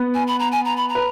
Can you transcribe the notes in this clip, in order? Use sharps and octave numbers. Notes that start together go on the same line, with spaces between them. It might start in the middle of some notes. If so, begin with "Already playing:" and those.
Already playing: B3 B4
G#5
B5
A#5
G#5
A#5
B5
A#5
B4